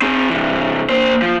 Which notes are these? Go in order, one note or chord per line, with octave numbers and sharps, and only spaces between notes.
C4 G#4
C3 E3
A#3 C5
F3